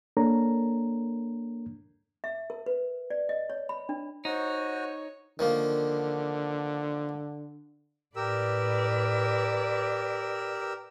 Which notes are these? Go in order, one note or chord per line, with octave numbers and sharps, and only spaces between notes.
A#3 D4 A4 A#4 C#5 A#5
E5
A#4
B4
D5
D#5
C#5
B5
D4
D#4 F#4 C5 C#5
D3 D#3 F3 A#3
A2 G4 A#4 B4 D5 E6